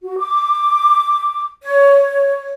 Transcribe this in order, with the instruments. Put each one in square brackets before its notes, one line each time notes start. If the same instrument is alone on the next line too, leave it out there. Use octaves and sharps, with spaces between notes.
[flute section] F#4
D6
C#5